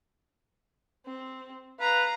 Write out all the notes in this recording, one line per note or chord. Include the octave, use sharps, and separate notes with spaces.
C4
B4 F5 A#5